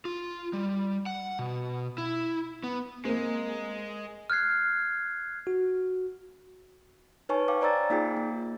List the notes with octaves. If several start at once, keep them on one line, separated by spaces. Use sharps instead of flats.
F4
G3
F#5
B2
E4
B3
G#3 A#3 C4 A#4
F6 F#6 G#6 C7
F#4
D#4 B4 C#5 G#5 A5 C#6
F5 G5 D6
C5 D5 A#5 E6 A6
A#3 D#4 F4 G#4 G5
A#3